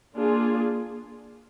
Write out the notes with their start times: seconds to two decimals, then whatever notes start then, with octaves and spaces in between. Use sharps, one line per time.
0.16 A#3 D4 F4 G#4